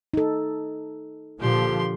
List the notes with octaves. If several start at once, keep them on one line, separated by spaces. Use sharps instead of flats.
D#4 A4
A#2 D3 F3 G4 C6